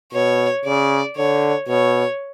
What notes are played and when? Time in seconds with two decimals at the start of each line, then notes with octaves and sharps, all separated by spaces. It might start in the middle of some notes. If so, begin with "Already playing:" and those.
0.13 B2 C#5
0.65 C#3 D5
1.17 D3 C#5
1.68 B2 C#5